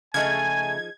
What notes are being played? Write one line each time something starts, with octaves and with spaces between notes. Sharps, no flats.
C#3 F3 A3 D#4 G#4 G#5 G#6